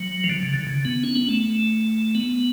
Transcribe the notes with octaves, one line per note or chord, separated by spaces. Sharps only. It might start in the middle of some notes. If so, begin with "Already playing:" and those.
Already playing: F#3
F3
D3
C#3
D3
C#3
B3
C#4
B3
A3
B3